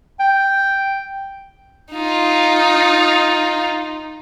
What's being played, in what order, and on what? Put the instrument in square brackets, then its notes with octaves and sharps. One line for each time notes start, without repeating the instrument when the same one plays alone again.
[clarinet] G5
[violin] D#4 F4